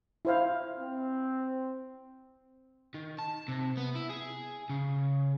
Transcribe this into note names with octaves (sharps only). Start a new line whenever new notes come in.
E4 C5 F5
C4
D#3
A5
C3
B3
E4
G#4
C#3